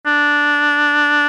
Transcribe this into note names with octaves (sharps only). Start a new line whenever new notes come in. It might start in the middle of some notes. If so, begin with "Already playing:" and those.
D4